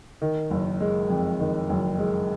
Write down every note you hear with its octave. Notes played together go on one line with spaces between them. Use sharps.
D#3
F#1
G#3
F2
D#3
F#1
G#3